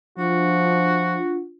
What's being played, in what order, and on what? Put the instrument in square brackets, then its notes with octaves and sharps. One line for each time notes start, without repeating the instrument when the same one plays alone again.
[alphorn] F3 [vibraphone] D4 F4 [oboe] F#4